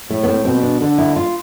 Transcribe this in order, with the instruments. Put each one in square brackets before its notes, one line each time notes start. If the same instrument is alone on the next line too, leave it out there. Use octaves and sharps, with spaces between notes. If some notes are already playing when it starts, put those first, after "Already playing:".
[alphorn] A2 [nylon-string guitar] A3
[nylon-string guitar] B3
C4
[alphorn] B2 [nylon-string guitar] C4
[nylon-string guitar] D4
[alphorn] D3 [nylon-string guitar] D4
[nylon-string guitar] E4
F4